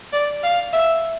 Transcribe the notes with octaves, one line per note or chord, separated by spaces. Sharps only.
D5
F5
E5